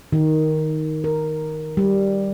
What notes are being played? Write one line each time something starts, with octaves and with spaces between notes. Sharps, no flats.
D#3
A#4
G3